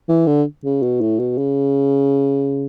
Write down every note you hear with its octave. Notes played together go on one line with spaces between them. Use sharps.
E3
D3
C#3
B2
A2
B2
C#3